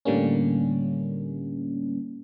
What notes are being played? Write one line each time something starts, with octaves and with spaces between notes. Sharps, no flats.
A2 D3 G3 A#3 C#4